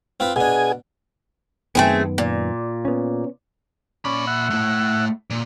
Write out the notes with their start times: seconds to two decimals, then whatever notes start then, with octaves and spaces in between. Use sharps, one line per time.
0.20 C4 F4 B4
0.36 B2 D4 G#4 G#5
1.75 F#2 D#3 A3 B3 C4 G#4
2.18 A#2
2.85 B3 C#4
4.05 A#2 C#4 D5 B5
4.27 E5 F#5
4.50 A3 E4
5.30 A#2